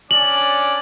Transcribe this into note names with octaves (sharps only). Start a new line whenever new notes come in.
C#4 D4 D5 F#7